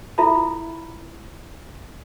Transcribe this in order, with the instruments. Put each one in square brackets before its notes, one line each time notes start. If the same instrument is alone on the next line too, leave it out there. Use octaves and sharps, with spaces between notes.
[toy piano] E4 F4 A4 E5 A#5 B5